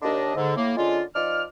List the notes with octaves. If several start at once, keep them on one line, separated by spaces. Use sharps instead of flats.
D#2 D4 D#5
G#2 D3
A2 A#3
D3 G#3 C#4 F4
F3 D#4 D5 F6